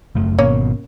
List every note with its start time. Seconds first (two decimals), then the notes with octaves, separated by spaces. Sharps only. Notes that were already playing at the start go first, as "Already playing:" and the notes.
0.15 F#1 F#2 A3
0.39 G#1 B2 A#3 C#4 C#5